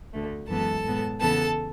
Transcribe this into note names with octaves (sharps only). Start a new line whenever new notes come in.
D2 D3 A3
F#2 E3 G#3 B3 A4 A5
A2 G#3 B3
E2 C#3 E3 B3 A4 A5